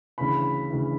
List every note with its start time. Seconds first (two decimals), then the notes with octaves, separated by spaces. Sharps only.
0.18 D2 C#3 E3 B5
0.70 D2 C#3 E3